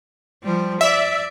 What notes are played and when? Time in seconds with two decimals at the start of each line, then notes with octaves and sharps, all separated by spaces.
0.43 F3 G3
0.81 D5 E5